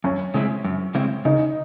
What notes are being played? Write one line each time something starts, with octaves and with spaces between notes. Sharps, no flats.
F#2 C#4
C#3 G#3 C4 E4
F#2
C#3 G#3 C4 E4
C#3 D#4